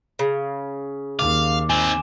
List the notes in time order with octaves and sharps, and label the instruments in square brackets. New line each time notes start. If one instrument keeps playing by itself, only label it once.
[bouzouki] C#3
[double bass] D#2 [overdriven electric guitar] F5 [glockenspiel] D6
[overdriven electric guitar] D#3 C4 [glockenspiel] G#5 E7